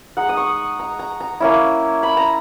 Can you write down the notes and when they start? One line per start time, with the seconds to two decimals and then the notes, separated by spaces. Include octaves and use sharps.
0.17 G#3 D#4 F#5
0.29 D#6
0.37 C#6
0.79 A#5
0.99 A#5
1.20 A#5
1.40 A#3 C#4 E4
2.03 B5
2.17 A#5